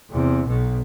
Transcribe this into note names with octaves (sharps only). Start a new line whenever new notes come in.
E2 C3
B1 B2